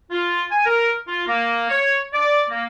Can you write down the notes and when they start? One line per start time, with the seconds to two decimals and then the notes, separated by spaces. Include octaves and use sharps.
0.11 F4
0.51 G#5
0.65 A#4
1.08 F4
1.27 A#3
1.69 C#5
2.13 D5
2.50 A#3